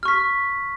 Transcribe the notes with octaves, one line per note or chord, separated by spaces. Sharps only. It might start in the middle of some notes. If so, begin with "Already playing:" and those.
C#6 F6 B6